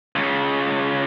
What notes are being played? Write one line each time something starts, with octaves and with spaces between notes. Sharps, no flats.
C#2 C#3